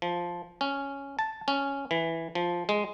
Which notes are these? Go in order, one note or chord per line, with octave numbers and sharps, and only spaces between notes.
F3
C#4
A5
C#4
E3
F3
G#3